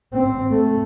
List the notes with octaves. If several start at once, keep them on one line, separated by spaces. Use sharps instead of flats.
C4
A3